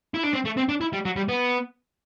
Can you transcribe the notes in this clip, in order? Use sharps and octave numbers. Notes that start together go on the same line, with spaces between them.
E4
D4
C4
A3
C4
D4
E4
G3
F#3
G3
B3